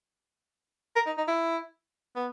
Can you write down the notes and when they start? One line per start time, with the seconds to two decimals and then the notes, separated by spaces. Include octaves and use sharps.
0.96 A#4
1.06 D#4
1.18 D#4
1.28 E4
2.16 B3